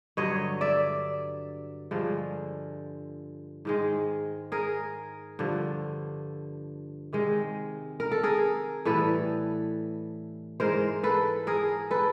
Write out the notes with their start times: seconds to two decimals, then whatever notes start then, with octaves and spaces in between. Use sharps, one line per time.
0.17 G2 D3 F#3 C#5 D#5
0.61 D5 E5
1.91 G2 D3 F3 G#3
3.65 G#2 D#3 G#3
4.52 G#4 A#4
5.39 G2 D3 F3
7.13 C3 D#3 G#3
8.00 A#4
8.12 A4
8.23 G#4 A#4
8.85 A2 E3 G3 A4 B4
10.60 G#2 E3 G#3 A#4 C5
11.03 A4 B4
11.47 G#4 A#4
11.91 A4 B4